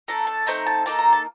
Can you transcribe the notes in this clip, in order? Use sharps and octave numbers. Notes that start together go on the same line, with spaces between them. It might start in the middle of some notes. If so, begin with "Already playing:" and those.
A3 D4 A4 A#5
A5
A3 C4 D#4 A#5
A5
A#3 D#4 A4 A5
A#5
A5